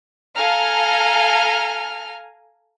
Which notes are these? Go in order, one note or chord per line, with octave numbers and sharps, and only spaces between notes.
A4 F5 G#5 A#5 F6